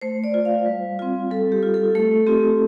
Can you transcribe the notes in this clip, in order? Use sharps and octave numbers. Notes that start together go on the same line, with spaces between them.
A3 C5
D5
F4
F5
G3
C4 F4
G3 A4
G4
F4
A4
A3 A4
C4 F4 G4